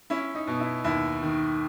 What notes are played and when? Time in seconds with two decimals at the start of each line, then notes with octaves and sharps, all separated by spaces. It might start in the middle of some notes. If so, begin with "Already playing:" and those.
0.10 C#4 E4
0.35 D#4
0.47 B2
0.60 E4
0.84 D#2 E4
1.22 D#3